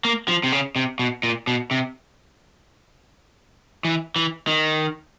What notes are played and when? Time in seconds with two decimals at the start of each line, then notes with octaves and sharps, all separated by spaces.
0.05 A#3
0.28 F3
0.44 C3
0.52 C#3
0.76 C3
0.99 B2
1.23 A#2
1.47 B2
1.71 C3
3.85 E3
4.16 E3
4.48 D#3